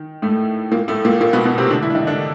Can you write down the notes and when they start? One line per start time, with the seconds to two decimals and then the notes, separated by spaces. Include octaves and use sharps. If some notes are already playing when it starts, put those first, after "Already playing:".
Already playing: D#3
0.22 A2 A3
0.72 A#2 A#3
0.88 A2 A3
1.05 A#2 A#3
1.21 A#2 A#3
1.33 B2 B3
1.45 B2 B3
1.58 C3 C4
1.70 D3 D4
1.82 E3 E4
1.90 D4
1.95 D#3 D#4
2.07 D3 D4